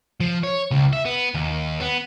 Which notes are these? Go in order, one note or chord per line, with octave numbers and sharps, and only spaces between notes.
F3
C#5
C#2
E5
B3
D#2
B3